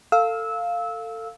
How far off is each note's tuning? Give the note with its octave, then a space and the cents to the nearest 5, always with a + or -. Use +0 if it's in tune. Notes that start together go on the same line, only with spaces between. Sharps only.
A4 +25 F5 +0 E6 -20